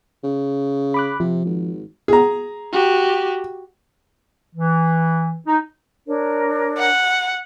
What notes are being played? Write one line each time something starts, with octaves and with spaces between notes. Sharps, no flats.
C#3
B5 D6 F#6
C3 F3
G#1
G#4 A#5
F#4 G4
E3
D#4
D4 A#4 C#5
F#5